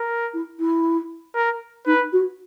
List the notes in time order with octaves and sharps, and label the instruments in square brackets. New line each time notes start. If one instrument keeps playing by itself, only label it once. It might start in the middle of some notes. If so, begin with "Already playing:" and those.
Already playing: [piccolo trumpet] A#4
[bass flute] E4
E4
[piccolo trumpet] A#4
[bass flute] D#4 [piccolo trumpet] B4
[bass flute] F#4